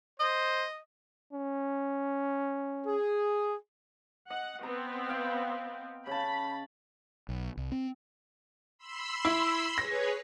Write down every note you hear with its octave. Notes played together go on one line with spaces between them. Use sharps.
C5 D#5
C#4
G#4
D#5 F#5
B3 C4 A#5
F5 G5
C#3 A5 B5
B1
C2
C4
B5 C6 E6
E4
G#4 B4 C#5 A#6